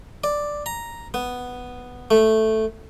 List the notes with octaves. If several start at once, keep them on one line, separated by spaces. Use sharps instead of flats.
D5
A#5
B3
A3